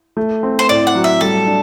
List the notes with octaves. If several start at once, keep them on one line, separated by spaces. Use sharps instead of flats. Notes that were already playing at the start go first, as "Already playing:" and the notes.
A3
C4
C5
A2 D5
F#5
F#3
E5
G3 A4
D4